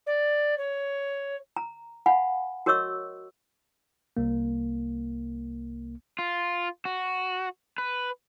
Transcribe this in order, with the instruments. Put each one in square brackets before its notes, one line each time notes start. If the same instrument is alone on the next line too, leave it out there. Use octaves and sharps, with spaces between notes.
[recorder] D5
C#5
[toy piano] A#5
F5 F#5 G#5 B5
F#4 A#4 C#5 D#5 C#6 E6
[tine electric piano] C2 A#3
[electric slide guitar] F4
F#4
B4